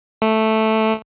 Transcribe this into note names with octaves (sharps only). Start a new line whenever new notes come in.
A3